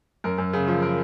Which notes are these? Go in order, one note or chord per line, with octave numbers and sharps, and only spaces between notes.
F#2 A#4
F#2
C#3
F3
A#4